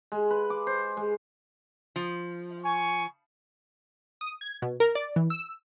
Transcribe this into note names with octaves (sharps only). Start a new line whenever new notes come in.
G#3
B4
D6
C5
G#3
F3
G#5 C#6
D#6
G#6
B2
A#4
D5
E3
E6